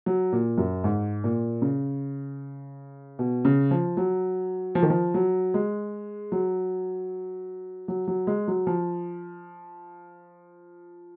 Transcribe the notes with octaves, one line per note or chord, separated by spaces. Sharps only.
F#3
A#2
F#2
G#2
A#2
C#3
B2
C#3
F3
F#3
F3
D#3
F3
F#3
G#3
F#3
F#3
F#3
G#3
F#3
F3